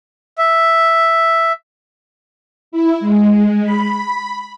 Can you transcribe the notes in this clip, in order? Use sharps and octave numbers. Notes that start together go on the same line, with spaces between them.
E5
E4
G#3
B5